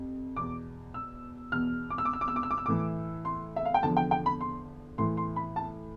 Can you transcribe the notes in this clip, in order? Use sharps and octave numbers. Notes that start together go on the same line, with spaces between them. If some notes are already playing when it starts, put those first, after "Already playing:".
Already playing: F2 C3
E2 B2 D6
E6
E2 B2 F6
D6
E6
D6
E6
D6
E6
D6
E6
D6
E6
A2 E3 D6
C6
E5
F5
G5
E2 D3 F3 A5
G5
G5
B5
C6
A2 E3 C6
C6
B5
A5